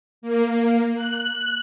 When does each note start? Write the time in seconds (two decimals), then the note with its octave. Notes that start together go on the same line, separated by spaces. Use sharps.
0.22 A#3
0.95 F#6